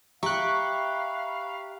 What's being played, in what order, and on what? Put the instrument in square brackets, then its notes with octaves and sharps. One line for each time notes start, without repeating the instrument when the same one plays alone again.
[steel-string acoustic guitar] G4 [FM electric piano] E5 A#5 [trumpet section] F5 B5 [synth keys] C#6 F#6